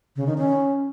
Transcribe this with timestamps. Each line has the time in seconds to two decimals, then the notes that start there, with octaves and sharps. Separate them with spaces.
0.16 C#3
0.27 D#3
0.38 C#4